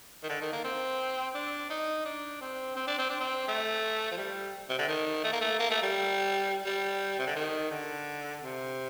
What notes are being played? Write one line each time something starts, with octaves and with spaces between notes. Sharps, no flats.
D#3
D3
D#3
A#3
C4
D4
D#4
D4
C4
C4
D4
C4
D4
C4
A3
F3
G3
C3
D3
D#3
A3
A#3
A3
A#3
A3
G3
G3
C3
D3
D#3
D3
C3